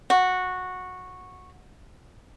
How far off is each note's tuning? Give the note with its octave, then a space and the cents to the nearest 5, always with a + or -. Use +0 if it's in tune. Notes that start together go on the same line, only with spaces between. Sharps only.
F#4 -10